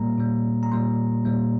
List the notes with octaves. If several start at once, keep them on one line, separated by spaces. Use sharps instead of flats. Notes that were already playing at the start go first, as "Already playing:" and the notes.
Already playing: A#2 G3 A#3 A#5
A#2 G3 A#3
A#5
A#2 G3 A#3 C6
A#2 G3 A#3